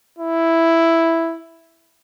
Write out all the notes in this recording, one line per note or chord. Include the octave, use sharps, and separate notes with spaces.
E4